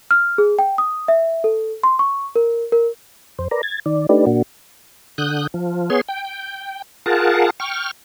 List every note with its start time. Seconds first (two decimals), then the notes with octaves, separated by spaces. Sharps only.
0.11 F6
0.38 G#4
0.59 G5
0.78 D#6
1.08 E5
1.44 A4
1.83 C6
1.99 C#6
2.36 A#4
2.72 A#4
3.39 F2 C5
3.51 A#4 B4 D5 A#5
3.63 G#6 A6
3.86 D#3 D5
4.09 A3 D4 D#4 G4 B4 D5
4.26 A#2 A#3 D4 F#4
5.18 D3 D#6 F#6 G6
5.54 F3
5.90 B3 G#4 C#5 C6
6.09 G5
7.06 F4 G#4 A#4 F#5 A5
7.60 G5 C#6 F6